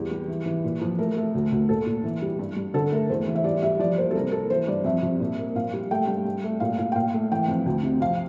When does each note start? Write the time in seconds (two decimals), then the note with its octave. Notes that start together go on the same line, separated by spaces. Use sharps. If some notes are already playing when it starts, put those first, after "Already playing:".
Already playing: E2 G3 G4
0.11 G3
0.28 E3
0.46 E3
0.64 A#2
0.81 F3
0.98 A3 A#4
1.17 A3
1.35 D2
1.52 D2
1.69 A#2 A4
1.86 A#2
2.04 E3
2.22 G3
2.39 G2
2.57 G2
2.74 D3 A4
2.92 A3 A#4
3.09 E2 C5
3.28 E3
3.36 E5
3.44 G3 D5
3.62 G3 E5
3.79 F3 D5
3.97 A#3 C5
4.11 A4
4.15 C2 A#4
4.32 A#3 A4
4.50 E3 C5
4.67 G2 D5
4.85 F2 E5
5.03 F2
5.20 A#2
5.38 A#3
5.56 A#2 F5
5.73 G3
5.91 A3 G5
6.07 G2
6.25 G2
6.44 A3
6.60 A#2 F5
6.78 A#2 F5
6.92 G5
6.95 A#2 F5
7.14 A3
7.32 E3 G5
7.48 F2
7.66 D2
7.83 C3
8.01 F2 F5